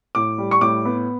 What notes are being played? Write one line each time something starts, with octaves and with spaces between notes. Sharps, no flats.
A2 D6
G3
C#6
A2 D6
B3